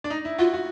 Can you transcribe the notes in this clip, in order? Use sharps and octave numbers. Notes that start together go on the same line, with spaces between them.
D4
D#4
E4
F4 F#4
F#4